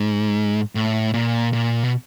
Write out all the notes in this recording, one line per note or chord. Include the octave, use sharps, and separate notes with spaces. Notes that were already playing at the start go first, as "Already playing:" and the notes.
Already playing: G#2
A2
A#2
A#2
B2